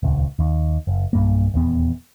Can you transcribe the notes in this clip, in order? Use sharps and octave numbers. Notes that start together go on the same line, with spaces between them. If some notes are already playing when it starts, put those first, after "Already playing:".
D#1 C#2
D#2
F#1
B1 G2 A#3
D#1 E2 B3